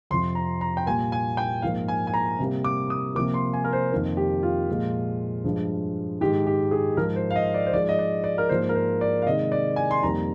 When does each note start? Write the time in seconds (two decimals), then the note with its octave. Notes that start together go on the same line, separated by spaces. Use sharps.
0.11 F2 C3 F3 C6
0.35 A#5
0.61 A#5
0.77 G5
0.86 A#2 G3 A#3 G#5
1.12 G#5
1.37 G5
1.62 G#2 F3 A#3 F5
1.88 G#5
2.07 G#5
2.14 A#5
2.39 C3 G3 A#3
2.64 D6
2.90 D#6
3.15 C3 F3 A#3 D6
3.34 C6
3.54 G#5
3.64 A#4
3.73 C5
3.91 F2 D#3 A#3
4.17 G4
4.43 F4
4.69 A#2 F3 G#3
5.44 G2 F3 G#3
6.21 G#2 D#3 G#3 G4
6.47 G4
6.71 G#4
6.97 G#2 F3 G#3 A#4
7.16 C5
7.30 F5
7.36 D#5
7.54 D5
7.66 C5
7.73 G#2 F3 G#3 D5
7.89 D#5
7.99 D5
8.24 D5
8.38 A#4
8.49 G#2 F3 A#3 C5
8.69 A#4
8.75 C5
9.01 D5
9.22 F5
9.26 C3 D#3 G#3 D#5
9.52 D5
9.76 G#5
9.91 C6
10.03 F2 D#3 G3 A#3 A#5